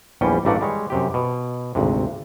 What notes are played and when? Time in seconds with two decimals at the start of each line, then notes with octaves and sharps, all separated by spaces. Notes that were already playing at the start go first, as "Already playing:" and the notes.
0.21 A#1 E2 G3 C#4 G5
0.45 A1 G2 A3 A#3 D5 F#5
0.61 G3 G#3 C#5
0.90 F#2 C3 G4
1.14 B2
1.75 G#1 D2 C3